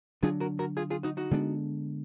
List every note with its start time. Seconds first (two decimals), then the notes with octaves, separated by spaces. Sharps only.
0.23 D3 F#3 D4 F4 G#4
0.40 F#4 A#4
0.59 F#4 A#4
0.77 F4 G#4
0.90 F4 G#4
1.03 D#4 F#4
1.17 D#4 F#4
1.31 D3 G#3 B3 D4